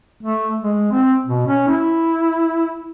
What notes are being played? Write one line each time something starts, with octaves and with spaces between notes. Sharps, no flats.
A3
G#3
C4
B2
C#4
E4